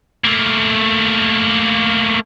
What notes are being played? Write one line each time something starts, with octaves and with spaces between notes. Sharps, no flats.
A3 A#3